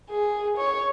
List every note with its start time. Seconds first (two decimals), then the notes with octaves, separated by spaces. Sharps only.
0.10 G#4
0.57 C#5